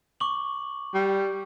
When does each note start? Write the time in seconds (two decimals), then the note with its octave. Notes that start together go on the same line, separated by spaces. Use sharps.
0.20 C#6 D6 F#7
0.94 G3